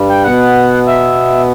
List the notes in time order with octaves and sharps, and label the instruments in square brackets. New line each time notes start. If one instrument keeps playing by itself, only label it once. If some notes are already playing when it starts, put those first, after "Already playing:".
Already playing: [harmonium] G2 G3
[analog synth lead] G5
[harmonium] B2 B3 [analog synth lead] F#5
[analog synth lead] E5